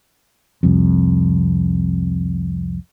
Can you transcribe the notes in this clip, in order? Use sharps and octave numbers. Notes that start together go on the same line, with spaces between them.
C2 F2